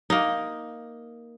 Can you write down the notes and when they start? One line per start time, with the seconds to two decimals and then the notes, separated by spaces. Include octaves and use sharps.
0.10 A#3 D#4